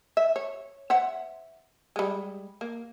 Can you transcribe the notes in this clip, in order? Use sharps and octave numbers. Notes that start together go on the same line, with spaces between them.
E5
C#5
C5 E5 F#5
G3 G#3
A#3